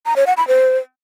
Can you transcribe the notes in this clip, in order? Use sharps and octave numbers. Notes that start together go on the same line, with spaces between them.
A#5
C#5
F#5
B5
C5